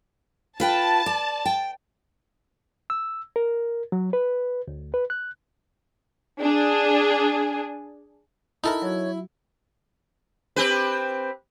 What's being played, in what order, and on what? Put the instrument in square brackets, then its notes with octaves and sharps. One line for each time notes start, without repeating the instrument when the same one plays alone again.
[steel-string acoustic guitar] F4 B4 G5 [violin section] A5
[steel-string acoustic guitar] D5
G5
[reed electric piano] E6
A#4
F#3
B4
D2
B4
F#6
[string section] D4 G#4
[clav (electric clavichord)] D#4 A4 A#4 [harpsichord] E4
[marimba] F#3 F#4 [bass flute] C#5
[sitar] C4 G4 B4